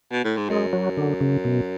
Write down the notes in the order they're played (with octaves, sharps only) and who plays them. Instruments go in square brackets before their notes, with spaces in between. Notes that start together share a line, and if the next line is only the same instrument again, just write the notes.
[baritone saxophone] B2
A2
G#2
[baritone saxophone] F#2 [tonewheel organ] G#3
[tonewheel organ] F#3
D3
C#3
B2